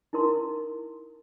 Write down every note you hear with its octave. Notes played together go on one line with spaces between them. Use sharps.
D#4 E4 A#4 C6